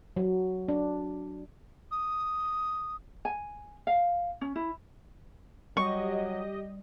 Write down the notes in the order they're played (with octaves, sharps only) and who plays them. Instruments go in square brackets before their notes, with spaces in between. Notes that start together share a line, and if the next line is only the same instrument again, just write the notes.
[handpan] F#3
D4
[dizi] D#6
[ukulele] G#5
F5
C#4
E4
[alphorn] F#3 [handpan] G3 [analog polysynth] G4 D#5 [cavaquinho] C#6